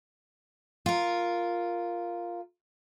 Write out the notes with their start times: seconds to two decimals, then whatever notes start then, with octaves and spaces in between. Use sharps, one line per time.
0.86 F4 A#4